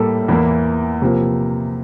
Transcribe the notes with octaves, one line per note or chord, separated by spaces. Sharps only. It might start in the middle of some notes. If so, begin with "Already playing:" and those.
Already playing: A2 G3 A#3 A4
E2 E3 A#3 E4
C3 F3 A#3